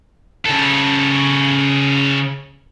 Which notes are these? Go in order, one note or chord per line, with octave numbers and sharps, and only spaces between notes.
C#3 A4